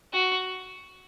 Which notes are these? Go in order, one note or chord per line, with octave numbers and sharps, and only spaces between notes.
F#4